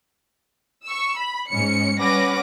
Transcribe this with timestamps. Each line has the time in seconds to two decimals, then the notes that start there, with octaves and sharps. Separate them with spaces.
0.85 C#6 E6
1.17 B5
1.49 G#2 C#4 C#7
1.98 G3 C#4 B4 F#5 D6 A#6